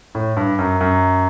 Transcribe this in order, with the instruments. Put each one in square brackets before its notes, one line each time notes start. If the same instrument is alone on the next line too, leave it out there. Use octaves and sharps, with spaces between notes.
[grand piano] A2
G2
F#2
F#2